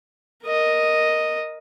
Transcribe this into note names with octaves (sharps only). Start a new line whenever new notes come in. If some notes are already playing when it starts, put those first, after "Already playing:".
A#4 D#5